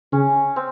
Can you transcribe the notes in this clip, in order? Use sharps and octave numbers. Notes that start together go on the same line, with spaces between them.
C#3 C#4
C4